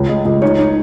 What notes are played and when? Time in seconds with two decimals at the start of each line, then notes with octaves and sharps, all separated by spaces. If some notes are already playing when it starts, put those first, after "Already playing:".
Already playing: C#2 C#5
0.08 G#3 D#5
0.26 C#2 D#5
0.42 D#4 C#5
0.59 D#4